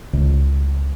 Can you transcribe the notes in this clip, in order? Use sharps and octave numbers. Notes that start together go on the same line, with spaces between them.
C#2